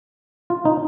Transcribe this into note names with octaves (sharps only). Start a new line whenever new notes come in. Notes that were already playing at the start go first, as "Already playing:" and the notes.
F4
D#4